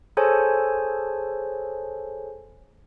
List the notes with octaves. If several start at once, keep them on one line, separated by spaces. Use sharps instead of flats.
G#4 A4 C5 C#5 G#5 A5